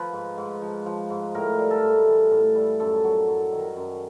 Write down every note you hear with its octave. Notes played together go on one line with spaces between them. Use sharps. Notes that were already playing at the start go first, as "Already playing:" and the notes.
Already playing: F3 B4
G#2
G#2
F3
F3
G#2
A2 A#4
G3
A4
A2
E3
A2
G3
F#2 A4
F#3
F#2
D#3
F#2